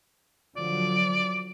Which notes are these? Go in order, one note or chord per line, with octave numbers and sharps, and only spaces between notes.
D3 F3 F#3 D5